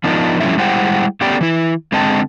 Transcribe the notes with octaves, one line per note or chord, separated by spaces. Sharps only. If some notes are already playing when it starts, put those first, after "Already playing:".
F3 B3 D4 D#4 F4 A#4
F3 G3 A3 C#4 E4 E5
G3 G#3 E4 C5 F#5 G5
A3 B3 C#4 G4 D5 G5
E3 E4
D3 G#3 C4 D#5 G5 A5